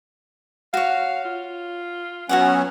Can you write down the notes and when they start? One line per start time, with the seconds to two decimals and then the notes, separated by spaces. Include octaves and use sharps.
0.74 F#4 C#5 F5
1.25 F4
2.29 F#3 B3 C#4 F#4 C#5 F#5